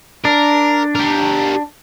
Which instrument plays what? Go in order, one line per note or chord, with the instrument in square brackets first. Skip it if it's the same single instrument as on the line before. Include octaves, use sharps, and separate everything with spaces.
[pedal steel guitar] D4 [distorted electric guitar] A#4
[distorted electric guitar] G4 A#4